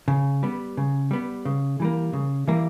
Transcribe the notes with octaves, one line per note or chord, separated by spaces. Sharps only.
C#3
G3 B3
C#3
G3 B3
C#3
E3 G3 A#3
C#3
E3 G3 A#3